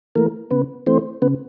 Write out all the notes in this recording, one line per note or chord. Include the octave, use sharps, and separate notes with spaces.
E3 A3 A#3 A#4
C#3 B3 B4
E3 A3 C4 C5
C#3 B3 B4